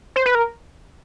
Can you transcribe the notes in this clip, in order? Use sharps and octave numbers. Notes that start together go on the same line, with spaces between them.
C5
B4
A#4